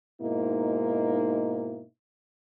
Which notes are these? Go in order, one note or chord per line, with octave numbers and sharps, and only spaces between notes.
G#2 B2 A#3 D#4 E4